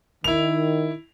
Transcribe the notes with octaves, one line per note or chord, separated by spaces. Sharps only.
D#3 E4 F7